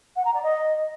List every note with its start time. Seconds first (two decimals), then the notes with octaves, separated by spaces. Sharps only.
0.16 F#5
0.25 A#5
0.34 D5
0.43 D#5